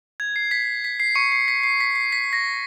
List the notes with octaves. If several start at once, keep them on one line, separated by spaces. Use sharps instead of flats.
G#6
C7
B6
B6
C7
C#6 C#7
C7
B6
C7
B6
C7
B6
A#6